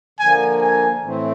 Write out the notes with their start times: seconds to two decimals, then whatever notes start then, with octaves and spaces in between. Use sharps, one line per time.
0.19 D3 F3 A#3 G#5
0.61 G#5
1.02 A2 E3 A3 C4